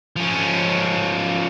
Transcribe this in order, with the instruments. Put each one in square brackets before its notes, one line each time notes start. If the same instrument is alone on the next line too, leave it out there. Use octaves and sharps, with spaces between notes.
[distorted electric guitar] F3 C#4